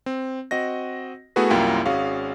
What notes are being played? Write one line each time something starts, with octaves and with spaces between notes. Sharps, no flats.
C4
C4 F#4 D#5 A#6
A3 B3 E4 F#4 G#4 B4
C2 F#2 A#3 E4 F4 G5
G#1 C#4 F#4 G#4 F5